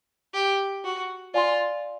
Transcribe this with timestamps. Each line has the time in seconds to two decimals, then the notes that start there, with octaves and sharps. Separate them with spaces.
0.34 G4
0.85 F#4
1.34 F4 D5 F5 G#5 C6